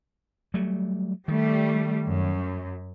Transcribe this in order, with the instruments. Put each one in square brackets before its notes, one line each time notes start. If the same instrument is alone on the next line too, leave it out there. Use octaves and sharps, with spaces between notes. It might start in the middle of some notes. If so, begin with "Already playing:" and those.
[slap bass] F#3 G3 A3
[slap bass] D#3 [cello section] G3 A3
[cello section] F#2